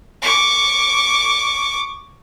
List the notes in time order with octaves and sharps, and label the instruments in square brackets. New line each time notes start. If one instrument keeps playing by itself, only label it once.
[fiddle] C#6 D6